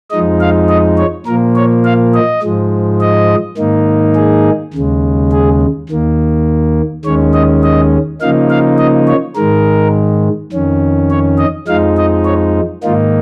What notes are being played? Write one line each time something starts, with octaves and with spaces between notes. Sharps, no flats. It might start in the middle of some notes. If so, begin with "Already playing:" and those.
F2 F3 G#3 D#4 D#5
F5
D#5
C#5
A#2 F3 A#3 A#4
C#5
F5
D#5
G#2 F3 G#3
D#5
G#2 D#3 A#3 D#4
G#4
D#2 C#3 G#3
G#4
D#2 D#3 A#3
D#2 D#3 G#3 C#4 C#5
D#5
D#5
C#3 F3 A#3 D#4 F5
F5
D#5
C#5
G#2 D#3 G#3 A#4
F2 D#3 C#4
C#5
D#5
F2 F3 G#3 D#4 F5
D#5
C#5
G#2 D#3 A#3 D#4 F4